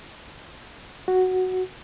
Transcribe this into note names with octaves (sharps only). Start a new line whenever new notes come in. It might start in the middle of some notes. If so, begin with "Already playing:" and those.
F#4